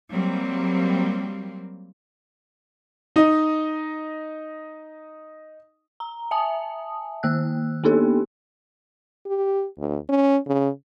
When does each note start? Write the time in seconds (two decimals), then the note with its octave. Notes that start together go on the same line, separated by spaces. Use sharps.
0.11 F#3 G3 A#3 C4
3.16 D#4 D#5
6.00 A#5
6.31 E5 G#5 A5 D#6
7.23 D#3 A#3 E6 F#6
7.84 A#3 B3 D4 D#4 G4 A4
9.26 G4
9.79 D2
10.09 C#4
10.48 C#3